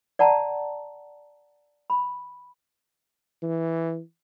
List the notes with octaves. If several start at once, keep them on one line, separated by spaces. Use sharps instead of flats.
D5 F#5 A5 A#5
B5
E3